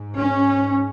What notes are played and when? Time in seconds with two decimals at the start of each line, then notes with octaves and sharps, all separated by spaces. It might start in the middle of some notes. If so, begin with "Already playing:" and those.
Already playing: G#2
0.15 C#4